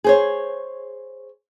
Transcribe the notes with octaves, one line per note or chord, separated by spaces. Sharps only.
G#4 C5 C#5